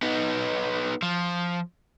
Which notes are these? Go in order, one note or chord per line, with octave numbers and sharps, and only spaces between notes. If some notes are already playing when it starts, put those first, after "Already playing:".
B3 D#4
F3